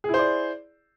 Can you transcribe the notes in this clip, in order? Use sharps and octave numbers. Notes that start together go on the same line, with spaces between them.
E4 G#4 C5 D5